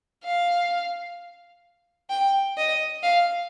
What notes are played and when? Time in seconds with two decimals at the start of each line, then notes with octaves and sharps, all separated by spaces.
0.24 F5
2.10 G5
2.57 D#5
3.03 F5